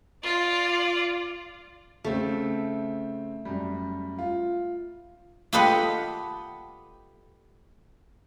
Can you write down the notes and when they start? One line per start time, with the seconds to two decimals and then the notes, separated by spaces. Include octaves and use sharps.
0.23 F4 D5
2.05 C#3 A3 C4
3.45 F#2 G3
4.19 F4
5.53 F4 G4 A4 B4 D#5 F#5